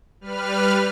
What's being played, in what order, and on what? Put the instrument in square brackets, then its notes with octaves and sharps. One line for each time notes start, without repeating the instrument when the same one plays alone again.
[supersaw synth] G3 B4 F6